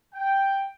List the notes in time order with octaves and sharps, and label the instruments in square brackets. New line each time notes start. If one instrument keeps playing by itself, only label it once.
[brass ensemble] G5